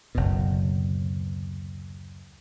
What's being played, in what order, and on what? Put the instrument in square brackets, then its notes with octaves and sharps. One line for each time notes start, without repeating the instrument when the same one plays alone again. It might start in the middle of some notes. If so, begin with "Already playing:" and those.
[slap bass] F#1 D2 B2